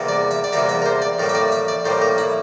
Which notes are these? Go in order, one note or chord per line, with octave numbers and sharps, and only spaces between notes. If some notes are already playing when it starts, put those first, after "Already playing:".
Already playing: E2 C3 G3 A#3
D5
E5
D5
E2 C3 G3 A#3 E5
E5
A#4
C5
D5
A2 G3 A#3 A#4
E5
D5
E5
D5
A2 G3 A#3 C5
A#4
E4